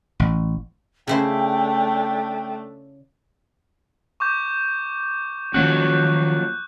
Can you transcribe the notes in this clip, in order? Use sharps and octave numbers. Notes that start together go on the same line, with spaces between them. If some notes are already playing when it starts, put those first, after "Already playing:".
A1
C#3 A3 D4 E4 C5 G5
C#6 D6 G6
D#3 F3 F#3 A#3 C#4 F#4 F#6